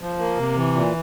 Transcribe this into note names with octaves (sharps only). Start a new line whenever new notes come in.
F3
A#3
C3
E3
A#2